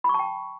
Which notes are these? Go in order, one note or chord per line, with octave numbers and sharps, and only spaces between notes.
G5 A5 B5 C#6